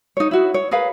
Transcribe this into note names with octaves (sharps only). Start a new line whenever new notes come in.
D#4 C#5
E4 F#4
C#5
G#4 A#4 B4 F5